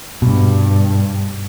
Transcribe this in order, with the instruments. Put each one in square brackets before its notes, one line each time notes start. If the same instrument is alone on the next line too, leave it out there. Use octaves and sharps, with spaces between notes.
[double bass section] G2 [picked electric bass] B2